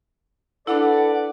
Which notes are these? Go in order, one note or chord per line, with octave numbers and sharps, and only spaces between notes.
D4 E4 A4 B4 D5 F#5